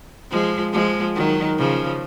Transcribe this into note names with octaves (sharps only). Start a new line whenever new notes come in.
F3 G#3
F3 G#3
D#3 F#3
C#3 F3